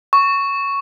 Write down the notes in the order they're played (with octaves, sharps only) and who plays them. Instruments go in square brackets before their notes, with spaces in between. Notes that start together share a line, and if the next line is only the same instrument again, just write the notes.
[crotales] C#6